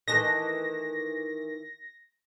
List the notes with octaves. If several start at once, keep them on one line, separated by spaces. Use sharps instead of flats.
D#3 E3 A3 A#6